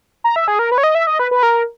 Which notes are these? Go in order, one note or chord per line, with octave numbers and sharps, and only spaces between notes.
A#5
E5
G#4
A#4
B4
C#5
D#5
E5
D#5
B4
B4
A#4